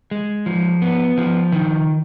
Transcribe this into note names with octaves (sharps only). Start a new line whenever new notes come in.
G#3
F3
B3
F3
D#3